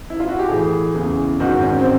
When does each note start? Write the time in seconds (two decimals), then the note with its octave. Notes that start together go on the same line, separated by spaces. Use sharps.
0.10 E4
0.20 F4
0.29 F#4
0.39 G4
0.49 A2 E3 G#4
0.94 E2 C#3 E3
1.40 G#2 D#3 F#4
1.62 C#4
1.80 C4